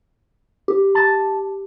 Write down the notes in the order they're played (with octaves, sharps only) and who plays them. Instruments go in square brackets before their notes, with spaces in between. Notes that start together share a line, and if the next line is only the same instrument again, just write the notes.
[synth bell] G4
[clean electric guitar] A5